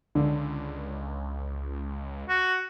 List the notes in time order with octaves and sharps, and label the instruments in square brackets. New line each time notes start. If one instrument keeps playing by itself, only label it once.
[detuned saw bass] C#2 [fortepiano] D3
[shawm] F#4